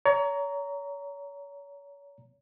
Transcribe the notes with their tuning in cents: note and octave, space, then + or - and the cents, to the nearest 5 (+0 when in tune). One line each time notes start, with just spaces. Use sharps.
C#5 +35 A#5 +0